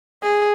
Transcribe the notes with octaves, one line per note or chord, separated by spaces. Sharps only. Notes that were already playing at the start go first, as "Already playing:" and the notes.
G#4